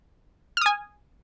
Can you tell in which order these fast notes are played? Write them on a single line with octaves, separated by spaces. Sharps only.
F6 D#6 G#5